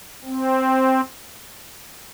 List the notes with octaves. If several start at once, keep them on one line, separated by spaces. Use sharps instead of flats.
C4